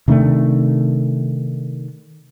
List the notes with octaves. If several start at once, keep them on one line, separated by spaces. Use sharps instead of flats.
C3 D#3 A3 D4